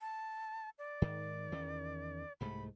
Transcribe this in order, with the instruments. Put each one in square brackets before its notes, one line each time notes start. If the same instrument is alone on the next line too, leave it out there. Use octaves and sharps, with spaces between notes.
[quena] A5
D5
[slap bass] G#2 D#3
E2 D#3 C#4
[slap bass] C2 G#2 A3 [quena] B5